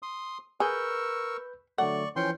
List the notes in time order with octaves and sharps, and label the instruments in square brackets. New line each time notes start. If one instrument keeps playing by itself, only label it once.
[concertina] C6 D#6
[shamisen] G#4 [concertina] A#4 C#6 E6 [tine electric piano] B4 G6
[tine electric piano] D3 F#3 A3 [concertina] D5 C#6 [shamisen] F#5
[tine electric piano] E3 F3 C#7 [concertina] C#4 G5 C6